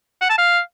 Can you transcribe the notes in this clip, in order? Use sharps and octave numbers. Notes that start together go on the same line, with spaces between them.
F#5
A5
F5